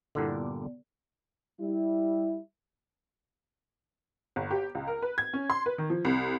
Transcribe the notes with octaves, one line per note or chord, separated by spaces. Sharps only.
G2 A#2 D3 E4 A4 F#5
B3 D5
G3 E4
G1
G4
C#2
A#4
B4
G#6
C#4
C6
B4
D#3
F3
C2